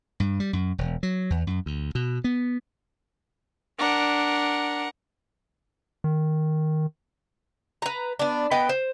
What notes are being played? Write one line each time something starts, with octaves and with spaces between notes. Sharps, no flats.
G2
G3
F#2
E1
F#3
E2
F#2
D2
B2
B3
D4 A#4 F#5
D#3
B4 A#5
B3 D4
B3 B4 D#5 G5
C5